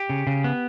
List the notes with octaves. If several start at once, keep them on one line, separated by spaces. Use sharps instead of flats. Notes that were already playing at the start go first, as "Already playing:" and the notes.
Already playing: G4
C#3
C#3
B3